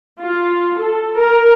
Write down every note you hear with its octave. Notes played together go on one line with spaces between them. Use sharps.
F4
A4
A#4